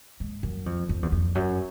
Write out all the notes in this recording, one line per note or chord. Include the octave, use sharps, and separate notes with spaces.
G#2
F#2
F2
F2
E2
F2
F#2